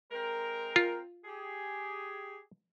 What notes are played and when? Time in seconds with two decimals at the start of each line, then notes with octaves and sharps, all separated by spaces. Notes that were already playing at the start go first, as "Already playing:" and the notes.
0.11 G#3 C4 A#4
0.76 F4
1.25 G4 G#4